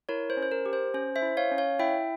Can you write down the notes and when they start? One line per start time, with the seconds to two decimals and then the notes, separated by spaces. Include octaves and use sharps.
0.09 E4 A#4 C#5
0.30 C5
0.37 C#4
0.43 C5
0.52 A#4
0.66 G4
0.73 C5
0.94 C#4 C5
1.16 C5 E5
1.22 E4
1.37 C#5 F5
1.52 C#4
1.58 C#5 F5
1.79 E4 E5 G5